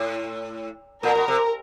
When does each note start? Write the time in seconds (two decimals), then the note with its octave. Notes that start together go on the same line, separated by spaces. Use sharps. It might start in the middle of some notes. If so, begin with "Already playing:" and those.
Already playing: A2
1.03 A#2 A#4
1.15 B2
1.28 C3